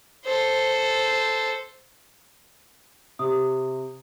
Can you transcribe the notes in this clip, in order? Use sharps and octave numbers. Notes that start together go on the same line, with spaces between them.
A4 C5
C3 D#6